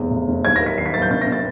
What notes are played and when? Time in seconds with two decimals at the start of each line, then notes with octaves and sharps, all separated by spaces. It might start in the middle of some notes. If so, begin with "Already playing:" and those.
Already playing: F1 E2
0.11 F1
0.28 F1
0.44 D#2 G#6
0.56 A#3 A#6
0.66 B6
0.77 D#3 C7
0.86 B6
0.94 A#3 A6
1.02 G6
1.11 C3 A6
1.21 A#6
1.27 C3
1.32 A6